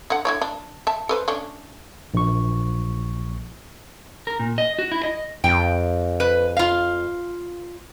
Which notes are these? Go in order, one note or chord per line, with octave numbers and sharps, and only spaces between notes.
D3 F#5
D3 E4 C#5
D4
E5 A5
A4 B4 C5
A3 C#4 D4
A#1 C#6
A#4
A#2
D#5
F#4
E4
D#5
F2 G5
B4
F4 F5